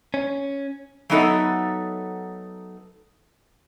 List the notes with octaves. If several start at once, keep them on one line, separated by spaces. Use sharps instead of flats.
C#4
F#3 A3 B3 D#4 A4 E5